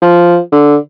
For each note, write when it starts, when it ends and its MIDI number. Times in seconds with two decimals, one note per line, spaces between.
0.02 0.38 53
0.52 0.77 50